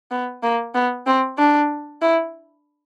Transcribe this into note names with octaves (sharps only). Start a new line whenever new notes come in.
B3
A#3
B3
C4
D4
E4